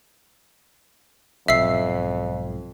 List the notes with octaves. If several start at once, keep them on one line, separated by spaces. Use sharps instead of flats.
B1 F2 G#2 E5 E6 C7